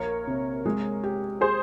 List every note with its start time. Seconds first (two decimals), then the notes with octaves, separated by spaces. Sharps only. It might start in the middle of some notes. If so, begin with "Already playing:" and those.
Already playing: A#1 A#3 A#4 C#5
0.27 C3
0.66 G#3
1.04 G4
1.41 G#4 C5